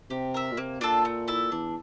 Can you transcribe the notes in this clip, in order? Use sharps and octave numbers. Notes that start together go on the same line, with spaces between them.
C3 G4
A#4 E5
A#2
C3 A#3
A#2 D4 F4 A4
A3
E4 A4
E2 D4